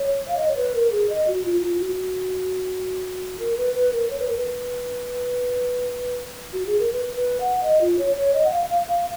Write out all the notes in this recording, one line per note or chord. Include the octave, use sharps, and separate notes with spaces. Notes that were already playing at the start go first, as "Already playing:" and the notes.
Already playing: C#5
F5
D#5
C#5
B4
A#4
G#4
D#5
F#4
F4
F4
F#4
A#4
B4
B4
A#4
C#5
B4
A#4
B4
F#4
G#4
A#4
B4
B4
F#5
D#5
F4
C#5
C#5
D#5
F#5
F5
F5
F5